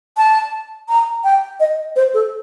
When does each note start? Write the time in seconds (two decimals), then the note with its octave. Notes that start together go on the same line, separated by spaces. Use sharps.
0.17 A5
0.89 A#5
1.24 G5
1.60 D#5
1.96 C5
2.14 A4